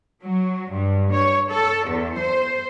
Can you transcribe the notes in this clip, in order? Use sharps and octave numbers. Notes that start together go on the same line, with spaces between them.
F#3
G2
C#5
A4
E2
C5